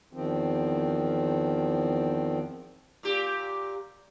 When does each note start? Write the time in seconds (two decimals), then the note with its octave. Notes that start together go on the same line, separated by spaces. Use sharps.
0.13 E2 D#3 F3 C4
3.03 A#2 G4